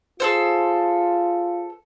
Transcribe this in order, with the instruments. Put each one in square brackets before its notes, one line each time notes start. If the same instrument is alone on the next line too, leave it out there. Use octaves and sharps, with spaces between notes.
[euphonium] F4 [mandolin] G#4 A4 C5